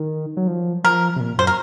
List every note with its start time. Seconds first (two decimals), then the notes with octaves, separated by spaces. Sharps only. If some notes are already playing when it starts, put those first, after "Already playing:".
Already playing: D#3
0.37 F#3
0.48 F3
0.84 F3 A#4
1.16 C3
1.20 A#2
1.38 F#2 C5
1.47 A#4